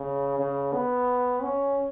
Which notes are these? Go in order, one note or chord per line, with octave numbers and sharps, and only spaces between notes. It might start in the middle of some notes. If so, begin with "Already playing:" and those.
Already playing: C#3
C#3
B3
C#4